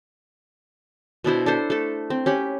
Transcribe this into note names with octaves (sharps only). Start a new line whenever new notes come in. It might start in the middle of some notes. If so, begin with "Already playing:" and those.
B2 D4 E4 C5
D4 A4 C5
A3 A4
C4
C#4 G4 B5